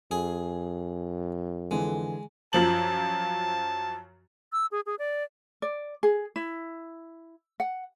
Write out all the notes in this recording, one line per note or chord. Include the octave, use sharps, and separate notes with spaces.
F2 G#4
D3 E3 G#3
F#2 F3 A5 F#7
E6
G#4
G#4
D5
D5
G#4
E4
F#5